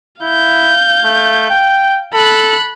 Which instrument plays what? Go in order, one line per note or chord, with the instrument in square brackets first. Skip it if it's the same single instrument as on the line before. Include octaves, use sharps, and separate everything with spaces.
[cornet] E4 [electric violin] F5 G6
[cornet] A3
G5
[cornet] A4 [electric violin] B5 F#6